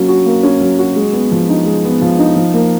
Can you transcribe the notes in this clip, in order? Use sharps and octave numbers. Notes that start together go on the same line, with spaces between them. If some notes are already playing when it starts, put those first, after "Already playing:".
Already playing: F#3 A#3 C#4
F#4
A#3
C#4
F#3
F#4
G#3
B3
F3
D#4
G#3
B3
F3
D#4
F3
A#3